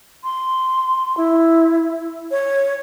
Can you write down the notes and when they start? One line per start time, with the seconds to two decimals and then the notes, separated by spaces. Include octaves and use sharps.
0.24 C6
1.17 E4
2.31 C#5